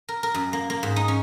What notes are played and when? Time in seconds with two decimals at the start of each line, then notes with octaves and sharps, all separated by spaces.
0.09 A#4
0.23 A#4
0.34 F#2
0.53 A#3
0.70 A#3
0.83 G#2
0.96 D#4
1.08 C#4